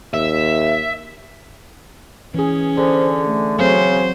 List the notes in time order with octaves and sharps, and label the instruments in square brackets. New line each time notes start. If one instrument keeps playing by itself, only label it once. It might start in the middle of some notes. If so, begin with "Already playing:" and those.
[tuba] D#2 [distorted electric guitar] E5
[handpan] E3 G#4 [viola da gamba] C#4
[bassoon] D3 [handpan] G#4 [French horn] C5
[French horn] A3
[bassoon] C#3 [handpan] F#3 C4 C#5 [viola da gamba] C5